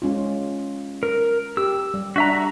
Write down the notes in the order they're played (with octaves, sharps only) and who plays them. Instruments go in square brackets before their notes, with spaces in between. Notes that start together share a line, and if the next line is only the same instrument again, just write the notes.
[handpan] G#3 C#4 F4
[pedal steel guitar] A#4
[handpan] G4 [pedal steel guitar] E6
[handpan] G3
[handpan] D4 [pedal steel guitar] F#4 E5 A#5